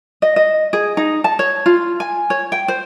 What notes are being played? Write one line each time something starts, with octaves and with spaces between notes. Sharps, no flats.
D#5
D#5
G#4
D#4
A5
C#5
F4
G#5
C#5
G5
C5